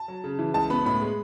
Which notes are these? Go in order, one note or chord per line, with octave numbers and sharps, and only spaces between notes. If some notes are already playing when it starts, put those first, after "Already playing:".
Already playing: A5
F#3
C#3
E3
C#2 A5
B3 B5
A2 B5
G#3